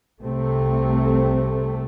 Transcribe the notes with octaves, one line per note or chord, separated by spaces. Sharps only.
C2 C3 A3 C4